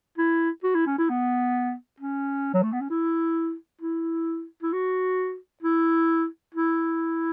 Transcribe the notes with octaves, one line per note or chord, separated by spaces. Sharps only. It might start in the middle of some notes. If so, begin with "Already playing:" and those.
E4
F#4
E4
C#4
E4
B3
C#4
F#3
A3
B3
C#4
E4
E4
E4
F#4
E4
E4